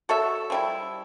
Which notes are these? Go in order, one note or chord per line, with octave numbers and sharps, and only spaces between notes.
F#4 A4 C#5 E5
F3 G3 E4